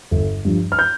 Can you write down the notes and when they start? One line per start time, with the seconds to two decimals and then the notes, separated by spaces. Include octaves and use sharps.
0.11 G1
0.45 G2 F3
0.72 F6
0.79 G6